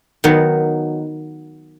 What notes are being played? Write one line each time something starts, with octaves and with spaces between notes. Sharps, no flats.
D#3 F#3 B3